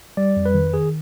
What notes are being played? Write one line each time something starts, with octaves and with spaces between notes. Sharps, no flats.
G3 D5
F2
B4
D#3
D#3 G#4